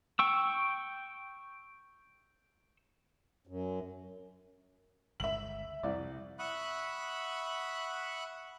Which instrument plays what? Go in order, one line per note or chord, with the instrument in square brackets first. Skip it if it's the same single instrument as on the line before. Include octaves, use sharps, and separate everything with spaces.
[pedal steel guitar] G5 C#6 E6
[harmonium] F#2
[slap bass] G1 C#2 [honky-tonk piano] E5 F#7
[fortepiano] C2 D5 [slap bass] F2
[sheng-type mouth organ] E5 F#5 B5 C#6 D#6 F#6